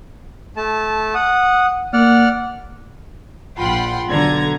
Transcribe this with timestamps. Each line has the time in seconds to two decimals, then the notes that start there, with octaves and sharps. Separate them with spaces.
0.57 A3 A5
1.14 F#5 D#6
1.93 A#3 D5 F#5 F6
3.58 A#1 F4 F#5 G5 B5 C6
4.08 B1 D3 A#5 G#6